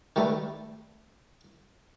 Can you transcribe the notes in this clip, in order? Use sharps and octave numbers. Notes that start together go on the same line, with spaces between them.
D#3 G3 A3 D#4 A4 B4